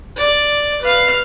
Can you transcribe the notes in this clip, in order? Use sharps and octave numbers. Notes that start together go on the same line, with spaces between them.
D5
B4 F5